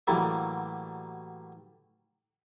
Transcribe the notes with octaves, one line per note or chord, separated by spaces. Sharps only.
A2 D3 E3 F#3 G3 A#3